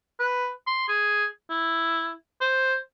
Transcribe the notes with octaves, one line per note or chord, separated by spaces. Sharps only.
B4
C6
G#4
E4
C5